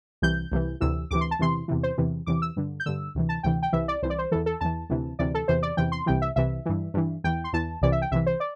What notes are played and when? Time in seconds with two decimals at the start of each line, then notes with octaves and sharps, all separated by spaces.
0.22 C2 C3 E3 G6
0.52 C2 C3 E3
0.81 D2 C3 E3 E6
1.11 D2 C3 E3 D6
1.21 C6
1.31 A5
1.39 E2 C3 E3 C6
1.68 E2 C3 E3
1.83 C5
1.98 E2 C3 E3
2.26 E2 C3 E3 D6
2.42 E6
2.56 G2 D3
2.80 G6
2.86 G2 D3 E6
3.15 D2 C3 E3
3.29 A5
3.43 D2 C3 E3 G5
3.63 G5
3.73 C2 C3 E3 E5
3.88 D5
4.02 C2 C3 E3 C5
4.10 D5
4.18 C5
4.32 E2 E3 A4
4.46 A4
4.61 E2 E3 A5
4.89 D2 C3 E3
5.19 D2 C3 E3 D5
5.34 A4
5.48 E2 C3 E3 C5
5.63 D5
5.77 E2 C3 E3 G5
5.92 C6
6.06 C2 C3 E3 G5
6.22 E5
6.36 C2 C3 E3 E5
6.66 G2 E3
6.94 G2 E3
7.24 E2 E3 G5
7.44 C6
7.53 E2 E3 A5
7.82 C2 C3 E3 D5
7.92 E5
8.02 G5
8.11 C2 C3 E3 E5
8.26 C5
8.40 D5